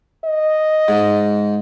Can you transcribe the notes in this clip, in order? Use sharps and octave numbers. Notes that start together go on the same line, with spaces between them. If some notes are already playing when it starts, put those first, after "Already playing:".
D#5
G#2